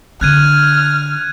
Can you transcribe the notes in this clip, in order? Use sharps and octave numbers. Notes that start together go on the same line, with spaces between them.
D3 D4 F6 F#6 G#6 D#7